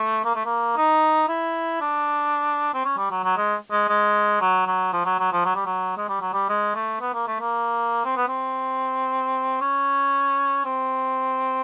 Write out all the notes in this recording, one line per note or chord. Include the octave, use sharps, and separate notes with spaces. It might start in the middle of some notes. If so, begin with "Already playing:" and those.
Already playing: A3
A#3
A3
A#3
D#4
E4
D4
C4
C#4
G3
F#3
F#3
G#3
G#3
G#3
F#3
F#3
F3
F#3
F#3
F3
F#3
G3
F#3
G#3
G3
F#3
G3
G#3
A3
B3
A#3
A3
A#3
C4
B3
C4
C#4
C4